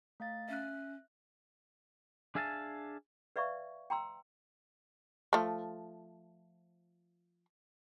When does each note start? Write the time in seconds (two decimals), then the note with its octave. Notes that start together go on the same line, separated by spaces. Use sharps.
0.20 A3 F5 A6
0.49 C#4 E5 F#6
2.35 D4 G#4 E5 F5 G#5 A5
3.36 B4 D5 E5 F5 C#6
3.90 G5 A#5 C6 E6
5.33 F3 A3